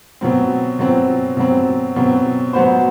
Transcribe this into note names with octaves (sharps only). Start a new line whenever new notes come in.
B2 F#3 C4
B2 F#3 C4
B2 F#3 C4
B2 F#3 C4
F#3 B3 F#4 C5